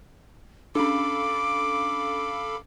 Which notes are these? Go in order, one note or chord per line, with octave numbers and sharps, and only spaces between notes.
C#4 D4 A4 F5 B5 D6